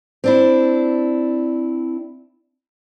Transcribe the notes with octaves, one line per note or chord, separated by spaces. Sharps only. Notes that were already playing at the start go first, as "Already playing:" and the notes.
C4 D4 E4